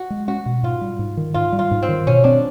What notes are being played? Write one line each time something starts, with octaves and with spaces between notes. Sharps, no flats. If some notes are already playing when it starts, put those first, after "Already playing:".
Already playing: F#4
G#3
C#4 F#4
B2
G#2 F4
G3
G#2
D#3
G#2 F4
G3
F4
G#2
C4
D#3
B2 C#4
C4 D4